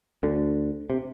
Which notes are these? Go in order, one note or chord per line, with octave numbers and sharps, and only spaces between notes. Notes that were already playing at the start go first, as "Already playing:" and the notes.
D2 D3
C3